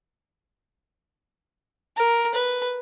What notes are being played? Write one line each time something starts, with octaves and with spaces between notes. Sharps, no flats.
A#4
B4